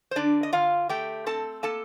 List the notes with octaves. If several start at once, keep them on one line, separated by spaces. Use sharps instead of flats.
C5
D3 D4 D5
D#5
D3 F4 F5
A3 G4 G5
C4 A4 A5
A#3 A4 A5